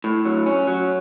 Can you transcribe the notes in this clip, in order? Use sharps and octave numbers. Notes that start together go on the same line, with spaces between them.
A2
F#3
C#4
F#3